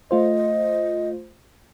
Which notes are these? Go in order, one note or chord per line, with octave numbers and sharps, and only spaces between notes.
A3 F4 C5 D#5